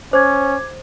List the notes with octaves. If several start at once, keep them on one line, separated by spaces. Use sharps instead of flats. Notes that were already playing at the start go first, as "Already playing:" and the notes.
C#4 C5 D6 G#6